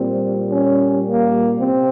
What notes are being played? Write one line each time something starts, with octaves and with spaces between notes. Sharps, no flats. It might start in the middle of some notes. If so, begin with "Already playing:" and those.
Already playing: A#2 G3 C4
C#4
A#3
C3 C4